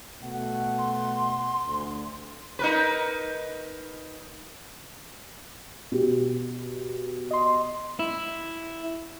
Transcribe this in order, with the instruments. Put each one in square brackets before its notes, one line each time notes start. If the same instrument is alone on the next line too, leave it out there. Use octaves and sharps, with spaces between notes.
[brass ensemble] B2 A3 F#5
[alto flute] C6
[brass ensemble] D2
[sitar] D#4 A#4 B4
[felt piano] B2 G4
[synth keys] D#5 C6
[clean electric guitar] E4